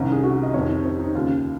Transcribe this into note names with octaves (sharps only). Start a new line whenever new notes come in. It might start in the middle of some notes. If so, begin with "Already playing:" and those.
Already playing: C2 C3 D#3 C#4
G#4
F#4
D#5
F2 C3 D#3 C#5
D#4
C4
D#4
D#2 C#3 F4